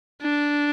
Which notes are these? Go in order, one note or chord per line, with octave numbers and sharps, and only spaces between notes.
D4